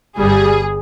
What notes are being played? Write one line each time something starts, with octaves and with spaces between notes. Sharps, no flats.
G1 G2 G3 G#4